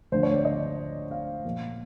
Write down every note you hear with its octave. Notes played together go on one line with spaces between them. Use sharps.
D2 D3 F3 C5
C#5
D5
D#5
F5
A#2 F3 A#3